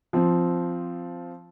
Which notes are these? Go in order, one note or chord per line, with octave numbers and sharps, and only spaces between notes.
F3 C4